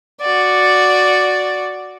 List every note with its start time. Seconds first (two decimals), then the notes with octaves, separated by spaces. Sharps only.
0.21 F#4 D5